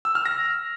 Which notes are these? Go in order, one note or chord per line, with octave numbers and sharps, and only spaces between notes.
E6
F6
A#6